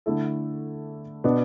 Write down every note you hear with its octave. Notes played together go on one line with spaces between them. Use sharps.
D3 A3 E4 A4
B2 B3 D4